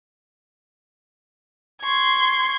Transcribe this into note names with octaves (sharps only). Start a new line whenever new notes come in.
C6 C#6 G#6